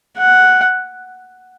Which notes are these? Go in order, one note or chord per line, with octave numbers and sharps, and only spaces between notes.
F#5